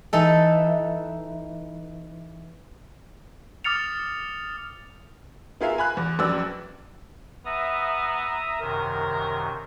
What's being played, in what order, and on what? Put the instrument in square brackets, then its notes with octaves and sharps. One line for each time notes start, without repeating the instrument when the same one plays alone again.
[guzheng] E3 D#4 A4
[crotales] D6 D#6 F6 A6 C#7 F7
[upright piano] B3 F4 G#4 A#4 E5 F5
G#5 B5 F#6
E2
A#1 F#2 B4 D5 E6
[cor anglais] B3 [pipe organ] E5 A#5 D#6
[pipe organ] F#2 C3 D#3 [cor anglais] A#4